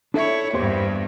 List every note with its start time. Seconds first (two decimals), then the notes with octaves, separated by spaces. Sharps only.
0.14 D4 E4 A4 C#5 E5
0.53 E2 G2 A#3 G4 C5